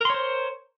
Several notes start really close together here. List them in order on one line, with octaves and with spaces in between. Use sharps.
A#4 C6 C#5 C5